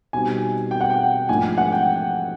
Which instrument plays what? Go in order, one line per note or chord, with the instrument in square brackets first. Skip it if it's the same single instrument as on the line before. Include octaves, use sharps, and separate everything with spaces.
[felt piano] B2 G3 C4 D#4 [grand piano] G#5
[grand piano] G5
F#5
G5
[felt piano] G#2 F3 A3 D4 F4 [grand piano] G#5
[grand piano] F#5
G5